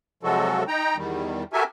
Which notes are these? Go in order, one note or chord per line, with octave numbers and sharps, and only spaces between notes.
C3 F3 F#3 G#3 F#4 A4
D#4 G5 A#5
E2 D#3 G3
F#4 G4 A4 A#4 E5 G#5